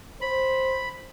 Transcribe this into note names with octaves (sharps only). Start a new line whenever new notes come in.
C5 B5